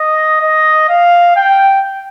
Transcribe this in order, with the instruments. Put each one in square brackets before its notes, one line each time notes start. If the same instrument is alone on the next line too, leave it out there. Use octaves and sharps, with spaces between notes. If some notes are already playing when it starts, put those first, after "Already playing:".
Already playing: [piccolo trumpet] D#5
D#5
F5
G5